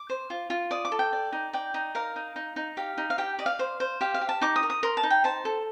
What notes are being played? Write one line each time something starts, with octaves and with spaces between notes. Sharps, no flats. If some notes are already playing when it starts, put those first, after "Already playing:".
Already playing: D6
C5
F4
F4
D5 D#6
D6
A4
G5
D5
D#4
D5 G5
D#4
A#4 F5
D#4
D#4
D#4
G4 F5
D#4
F5
G4 G5
D5 D#5
F5
C5
C5
G4 F5
F5
G4
A5
D#4 D6
D#6
A#4
D#6
A#4 C6
A5
D#4
G5
C5 A5
A4